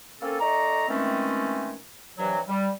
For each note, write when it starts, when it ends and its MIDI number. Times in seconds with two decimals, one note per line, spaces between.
0.20 0.40 58
0.20 0.40 60
0.20 0.40 61
0.20 0.40 69
0.40 0.85 57
0.40 0.85 63
0.40 0.85 74
0.40 0.85 82
0.89 1.73 51
0.89 1.73 52
0.89 1.73 56
0.89 1.73 57
0.89 1.73 60
0.89 1.73 61
2.18 2.39 43
2.18 2.39 48
2.18 2.39 52
2.18 2.39 54
2.48 2.68 55